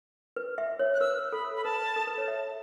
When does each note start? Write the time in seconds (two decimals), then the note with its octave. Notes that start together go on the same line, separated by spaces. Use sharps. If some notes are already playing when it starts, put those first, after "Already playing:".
0.36 B4
0.58 E5
0.79 C#5
0.94 F#6
1.00 B4 E6
1.32 A4 B5
1.57 B5
1.64 B4 A5
1.96 A4
2.07 B4
2.18 C#5
2.28 E5